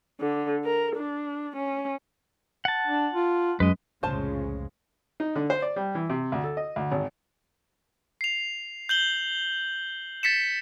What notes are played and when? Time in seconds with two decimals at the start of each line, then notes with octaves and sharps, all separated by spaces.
0.20 D3
0.64 A#4
0.96 D4
1.56 C#4
2.65 F#5 A5
2.87 D4
3.13 F4
3.60 F#2 G#3 B4 D#5
4.03 C2 F2 A2 C#3 G#3 F4 C5 A5
5.20 D#4
5.35 D3
5.50 C5
5.62 D5
5.76 G3
5.95 E3
6.10 C3
6.32 D2
6.44 A4
6.57 D#5
6.76 D2
6.92 G#1
8.21 C7 F7
8.89 G6 F#7 G7
10.23 A6 B6 C#7 E7